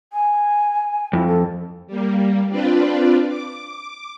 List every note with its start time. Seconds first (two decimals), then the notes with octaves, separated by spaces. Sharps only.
0.13 G#5
1.13 F2 E4
1.27 A4
1.87 G3 A#3
2.49 C4 D4 F4 B4 D5
3.27 D6